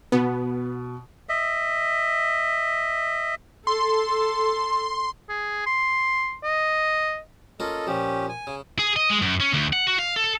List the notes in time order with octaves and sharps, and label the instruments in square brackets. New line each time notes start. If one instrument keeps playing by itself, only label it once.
[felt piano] B2 [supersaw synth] B3
[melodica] D#5 E5
[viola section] A4 [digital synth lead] C6
[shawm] G#4
C6
D#5
[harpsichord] A#3 C#4 F4 [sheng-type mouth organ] A4 D#5
[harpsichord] A#2 F3 [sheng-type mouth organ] C#4 G4
[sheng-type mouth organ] G#5
[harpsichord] C#3
[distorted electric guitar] G#4
D#5
G#3
F#2
C#4
D2
F#5
F#4
F5
A4